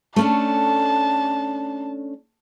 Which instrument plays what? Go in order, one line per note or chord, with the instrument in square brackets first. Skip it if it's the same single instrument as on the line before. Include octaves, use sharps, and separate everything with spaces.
[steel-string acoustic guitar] A3 C#4 D4 [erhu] A5